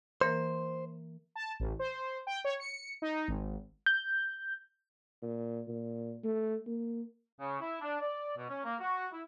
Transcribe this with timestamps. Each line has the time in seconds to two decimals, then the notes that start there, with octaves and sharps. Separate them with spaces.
0.21 E3 A#3 A#4 C5
1.36 A5
1.60 A1
1.79 C5
2.27 G5
2.45 C#5
2.60 C#7
3.02 D#4
3.28 G#1
3.86 G6
5.22 A#2
5.68 A#2
6.24 A3
6.67 A#3
7.39 C#3
7.60 E4
7.82 D4
8.00 D5
8.36 B2
8.49 C#4
8.64 A#3
8.80 F#4
9.12 E4